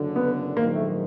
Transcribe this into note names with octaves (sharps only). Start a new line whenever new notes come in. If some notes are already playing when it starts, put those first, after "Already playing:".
Already playing: F#1 F#2 D3
B3
A#1 G#2 D#3 F#3 A#3
A3